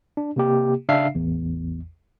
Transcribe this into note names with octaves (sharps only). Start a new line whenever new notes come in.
D4
C3 A#3 G4
C#3 D4 E5 F5 C7
A1 E2